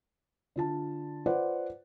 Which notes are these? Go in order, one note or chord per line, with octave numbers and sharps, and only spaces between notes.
D3 F4 A5
F4 B4 C5 D5 F#5